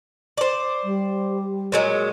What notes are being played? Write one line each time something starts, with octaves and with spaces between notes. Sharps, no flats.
C5 D5
G3
A#2 F#3 G#3